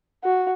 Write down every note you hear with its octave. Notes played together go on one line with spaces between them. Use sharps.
F#4